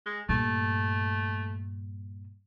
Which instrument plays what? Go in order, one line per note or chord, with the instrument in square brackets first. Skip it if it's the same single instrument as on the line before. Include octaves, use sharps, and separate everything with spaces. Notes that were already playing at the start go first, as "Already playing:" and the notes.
[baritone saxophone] G#3
[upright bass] G2 A#2 [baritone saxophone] A3